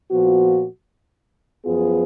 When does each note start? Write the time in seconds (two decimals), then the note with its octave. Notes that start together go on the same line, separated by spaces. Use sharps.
0.10 A#2 F3 B3 F#4
1.65 F#2 F3 B3 F4 G#4